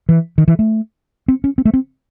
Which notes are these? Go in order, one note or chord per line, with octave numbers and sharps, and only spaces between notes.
E3
D#3
E3
A3
C4
C#4
C4
A3
C4